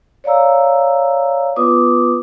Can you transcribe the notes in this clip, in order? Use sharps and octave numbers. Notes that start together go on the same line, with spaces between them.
C#5 D5 F5 A#5 E6
B3 F4 B4 D6 D#6